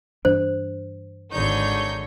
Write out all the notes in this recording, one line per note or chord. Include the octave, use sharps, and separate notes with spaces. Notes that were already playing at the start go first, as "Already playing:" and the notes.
G2 E3 D4 C5
G#1 D3 D#4 C#5 G6